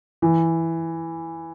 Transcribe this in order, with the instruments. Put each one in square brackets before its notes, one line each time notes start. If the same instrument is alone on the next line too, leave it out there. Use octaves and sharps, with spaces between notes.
[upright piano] E3